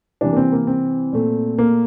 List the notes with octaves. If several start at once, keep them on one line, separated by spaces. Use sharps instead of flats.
C3 E3 G3 D4
A#3
C4
A#3
C4
A#2 A3
A#3